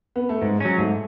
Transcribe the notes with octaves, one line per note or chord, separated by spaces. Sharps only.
B3
A3
G#2 G#3
F#3 C#4
G#2 A3